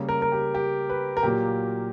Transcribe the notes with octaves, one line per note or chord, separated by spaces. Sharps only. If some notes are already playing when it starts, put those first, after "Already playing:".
Already playing: C#3 G3 A#3
A#4
A#4
G4
G4
B4
A#4
A#2 F#3 A#3 G4